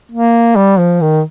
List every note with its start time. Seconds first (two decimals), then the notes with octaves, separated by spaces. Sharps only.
0.12 A#3
0.56 G3
0.79 F3
1.01 D#3